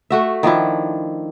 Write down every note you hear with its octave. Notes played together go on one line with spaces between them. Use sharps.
A3 F#4 E5
D#3 F3 D4 E4